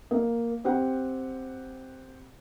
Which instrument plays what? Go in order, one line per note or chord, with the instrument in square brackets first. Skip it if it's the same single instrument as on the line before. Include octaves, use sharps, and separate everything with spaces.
[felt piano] A#3
C4 G4 F#5